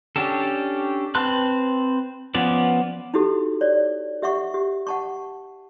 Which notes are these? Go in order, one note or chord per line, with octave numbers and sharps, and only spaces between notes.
C#4 D4 G4 A4
C4 B4 A5 C6 F#6
F3 B3 C#4 D5
D#4 E4 F#4 G4 A4
C#5 D5
G4 E5 F#5 C#6
G4
F#5 A5 C#6